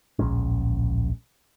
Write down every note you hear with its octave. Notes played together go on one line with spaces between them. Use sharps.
D1 A#1 G#3 C#4